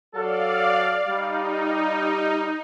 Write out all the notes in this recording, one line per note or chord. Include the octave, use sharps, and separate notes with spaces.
F#3 F#4 A4 D5 F5
G3 D#4